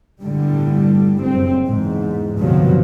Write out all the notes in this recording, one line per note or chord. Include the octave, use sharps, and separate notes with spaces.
G1 A2 D3 G3
F#1 C4
E2 G#2
C2 G2 B2 D3 F3 F#3